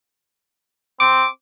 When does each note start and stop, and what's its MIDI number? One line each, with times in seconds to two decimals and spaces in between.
1.00 1.24 60
1.00 1.27 86